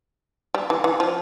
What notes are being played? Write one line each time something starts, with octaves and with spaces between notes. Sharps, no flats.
G3
E3
E3
F3